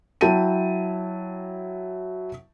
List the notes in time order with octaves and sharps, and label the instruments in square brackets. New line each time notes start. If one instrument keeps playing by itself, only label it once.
[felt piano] F#3 E4 G5 A5 D#7